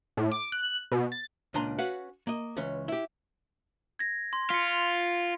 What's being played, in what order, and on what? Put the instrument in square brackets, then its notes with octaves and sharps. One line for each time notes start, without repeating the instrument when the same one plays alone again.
[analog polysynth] A2
D6
F#6
B2
A6
[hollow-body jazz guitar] C#2 A#2 D4 G#5 A#5 C6
C#4 F#4 B4 F5 F#5
A#3 D#5
C#2 E3 C#4
E4 G4
[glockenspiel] G#6 A#6
C6
[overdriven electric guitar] F4 [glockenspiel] B6 C#7